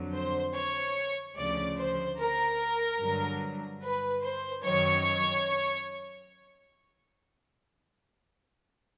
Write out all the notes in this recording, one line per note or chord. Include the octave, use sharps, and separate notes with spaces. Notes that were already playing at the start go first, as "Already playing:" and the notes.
Already playing: F2 D3 F#3
C5
C#5
D2 C#3 F3 D5
C5
A#4
G2 D3 F#3
B4
C5
F#2 D#3 F#3 C#5